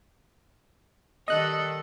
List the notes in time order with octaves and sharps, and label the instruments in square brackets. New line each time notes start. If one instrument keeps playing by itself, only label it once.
[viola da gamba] D#3 G3 A4 [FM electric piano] D#5 F#6